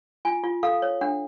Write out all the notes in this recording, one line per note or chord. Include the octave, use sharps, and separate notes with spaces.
F4 G#5
F4
A4 F5
C#5
D4 F#5